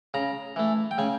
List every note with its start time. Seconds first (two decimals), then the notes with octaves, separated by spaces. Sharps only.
0.14 C#3 A#5
0.56 E3 A3
0.91 G5
0.98 C#3 G#5